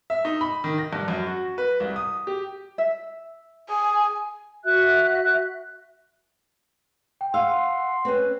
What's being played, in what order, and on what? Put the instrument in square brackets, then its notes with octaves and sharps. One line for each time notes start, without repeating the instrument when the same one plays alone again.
[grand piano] E5
D#4
B5
D#3
A#6
G2
F#2
F#4
B4
C2
D#6
G4
[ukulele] E5
[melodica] G#4 [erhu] G#5
[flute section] F#4 E5 F#6
[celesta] G5
[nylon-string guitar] F5 [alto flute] F#5 [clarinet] C6 [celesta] E6
[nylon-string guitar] C4 C#4 [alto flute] B4